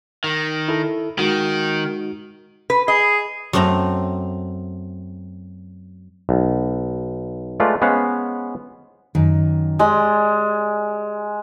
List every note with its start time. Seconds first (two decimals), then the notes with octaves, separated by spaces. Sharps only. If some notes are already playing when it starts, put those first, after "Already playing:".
0.24 D#3
0.68 E4 A4
1.19 D#3 G#3 D#4 F#4
2.70 B4
2.88 G#4 D#5
3.53 F#2 A3 C4 A#5
6.29 B1
7.60 G#3 A3 F4 B4 D5
7.81 G#3 B3 C#4 C5 F5 F#5
9.15 F#2 D#3
9.79 G#3 G4 D5 D#5